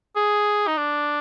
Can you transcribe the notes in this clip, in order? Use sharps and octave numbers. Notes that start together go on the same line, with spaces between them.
G#4
D#4
D4